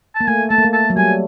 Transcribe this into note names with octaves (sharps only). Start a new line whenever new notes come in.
A5
A#3
A3 G#5
A3 A5
A#3
A3
A5
F#3
G3 G#5